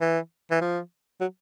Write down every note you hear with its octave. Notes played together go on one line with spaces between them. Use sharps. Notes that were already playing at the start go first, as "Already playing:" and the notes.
E3
E3
F3
F#3